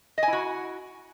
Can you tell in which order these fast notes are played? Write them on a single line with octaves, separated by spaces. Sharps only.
D#5 G#5 E4 F#4